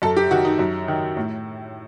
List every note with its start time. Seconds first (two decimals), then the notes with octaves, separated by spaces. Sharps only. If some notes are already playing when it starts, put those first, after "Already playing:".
0.02 F#2 A4
0.17 G4
0.31 D#3 F#4
0.45 D#4
0.59 F#2
0.88 D#3
1.17 A2